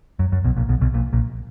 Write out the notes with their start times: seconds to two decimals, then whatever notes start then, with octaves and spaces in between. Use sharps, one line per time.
0.19 F#2
0.32 F#2
0.44 B1 B2
0.56 A#1 A#2
0.69 B1 B2
0.81 B1 B2
0.94 A#1 A#2
1.13 A#1 A#2